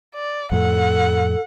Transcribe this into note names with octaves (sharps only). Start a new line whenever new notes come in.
D5
F2 A2 A4 F#5